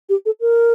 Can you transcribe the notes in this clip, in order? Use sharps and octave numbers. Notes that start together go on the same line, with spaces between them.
G4
A4
A#4